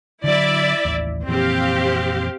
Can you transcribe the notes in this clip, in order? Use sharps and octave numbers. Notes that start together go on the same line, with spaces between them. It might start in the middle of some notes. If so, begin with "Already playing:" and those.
D3 F#3 E4 D5 E5
A1 D#2
F2 A#2 E3 C4 G4 F5